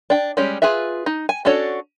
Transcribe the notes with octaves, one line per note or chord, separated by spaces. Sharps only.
D4 G5
G3 G#3 C#4 G4
F4 G#4 B4 E5
D#4
G#5
C#4 D4 F#4 A4 C#5